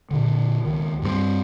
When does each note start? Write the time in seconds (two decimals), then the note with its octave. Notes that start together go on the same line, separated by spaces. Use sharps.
0.11 A#2 D3
0.65 C#2 D#3
1.02 G2 G3 G#3 C4